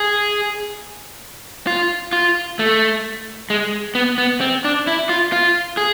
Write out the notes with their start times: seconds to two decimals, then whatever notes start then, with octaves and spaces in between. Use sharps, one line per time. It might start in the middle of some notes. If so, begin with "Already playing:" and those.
Already playing: G#4
1.67 F4
2.13 F4
2.59 A3
3.50 G#3
3.95 B3
4.18 B3
4.41 C4
4.65 D4
4.87 E4
5.09 F4
5.32 F4
5.77 G#4